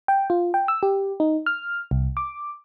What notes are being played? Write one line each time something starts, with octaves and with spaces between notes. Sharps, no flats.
G5
F4
G5
E6
G4
D#4
F6
C2
D6